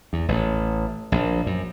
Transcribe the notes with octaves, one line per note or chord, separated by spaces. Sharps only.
E2
A1
A#1
F#2